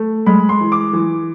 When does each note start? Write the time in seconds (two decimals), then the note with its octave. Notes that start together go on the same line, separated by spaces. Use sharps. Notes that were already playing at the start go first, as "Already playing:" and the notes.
Already playing: A3
0.26 G#3 B5
0.49 C6
0.61 E3
0.72 D6
0.93 E3